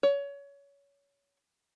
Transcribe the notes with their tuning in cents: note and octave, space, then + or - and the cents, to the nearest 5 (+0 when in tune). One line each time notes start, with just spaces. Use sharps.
C#5 +25